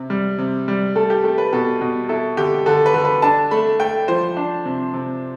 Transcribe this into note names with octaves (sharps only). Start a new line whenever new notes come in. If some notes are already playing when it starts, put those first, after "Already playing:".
Already playing: C3
G3
C3
G3
A3 A4
G4
A3 A4
B4
B2 A4
B2
E4 A4
D3 G4
D3 A4
B4
D3
B4
D4 A5
A3 B5
A3 G5
F3 C5
D4
C3
C3